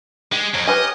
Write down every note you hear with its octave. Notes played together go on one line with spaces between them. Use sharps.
G#3 G4
F2 C#5 A#5
G4 A#4 B4 C#5 D#5 G#5